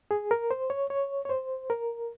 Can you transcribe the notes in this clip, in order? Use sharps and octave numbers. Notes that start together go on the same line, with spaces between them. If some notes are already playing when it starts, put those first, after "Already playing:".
G#4
A#4
C5
C#5
C#5
C#5
C5
A#4